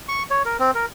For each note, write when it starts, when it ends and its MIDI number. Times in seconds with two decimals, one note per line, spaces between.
0.09 0.23 85
0.31 0.43 73
0.45 0.57 70
0.59 0.71 60
0.75 0.86 70